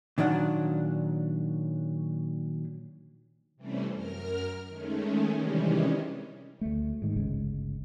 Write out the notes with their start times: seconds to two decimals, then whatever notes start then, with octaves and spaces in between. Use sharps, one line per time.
0.18 A#2 D#3 F#3 D4 F#5
3.56 C3 E3 G3 A3 C4 C#4
3.93 F#2 A#4 F6
4.68 D#3 G#3 A3 C#4
5.33 C3 D#3 E3 G3 G#3 C#4
6.61 D2 A3
7.02 G#2 D#3
7.16 G1 C#2 C#3 G#3